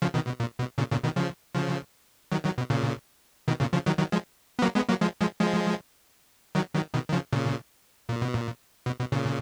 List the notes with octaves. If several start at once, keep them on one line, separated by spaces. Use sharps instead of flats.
C#3 F3
B2 D#3
B2
A#2
B2
A#2 C#3
A#2 C#3
B2 D#3
C#3 F3
C#3 F3
D#3 F#3
D#3 F#3
B2
A#2 C#3
B2 D#3
A#2 C#3
C#3 F3
D#3 F#3
D#3 F#3
F3 G#3
B3
F#3 A#3
G#3 B3
F#3 A#3
F3 G#3
F3 G#3
F3 G#3
D#3 F#3
D#3 F#3
B2 D#3
D#3
C#3 F3
A#2 C#3
A#2
B2
A#2
B2
B2
A#2 C#3